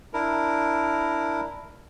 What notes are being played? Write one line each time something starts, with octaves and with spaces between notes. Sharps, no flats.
D4 E4 A#4